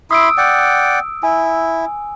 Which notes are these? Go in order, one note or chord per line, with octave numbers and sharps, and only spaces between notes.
E4 B5 C6 D#6 E6 D7
D5 F#5 G5
E4 G#5